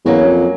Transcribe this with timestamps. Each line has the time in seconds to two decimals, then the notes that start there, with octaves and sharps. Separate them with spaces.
0.05 E2 F#3 A#3 C#4 F#4
0.25 F2